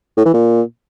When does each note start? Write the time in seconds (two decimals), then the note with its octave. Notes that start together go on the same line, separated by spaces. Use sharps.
0.17 A2
0.25 E3
0.34 A#2